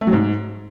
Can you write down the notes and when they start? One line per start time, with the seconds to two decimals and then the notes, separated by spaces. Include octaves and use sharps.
0.01 A3
0.07 F#3
0.13 G#2